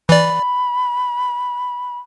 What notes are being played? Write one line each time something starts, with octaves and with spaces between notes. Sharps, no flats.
E3 D5 B5